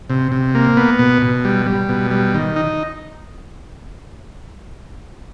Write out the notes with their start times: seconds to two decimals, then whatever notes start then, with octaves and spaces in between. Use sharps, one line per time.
0.10 C3
0.32 C3
0.55 A#3
0.77 B3
0.99 B2
1.22 B2
1.45 G3
1.66 G3
1.89 B2
2.11 G3
2.34 D#3
2.56 D#4